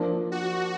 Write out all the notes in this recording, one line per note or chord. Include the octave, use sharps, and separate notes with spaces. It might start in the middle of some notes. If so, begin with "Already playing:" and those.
Already playing: F3 A#3 D4
F#4